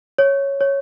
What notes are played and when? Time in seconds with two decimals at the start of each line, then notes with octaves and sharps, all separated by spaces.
0.18 C#5
0.61 C#5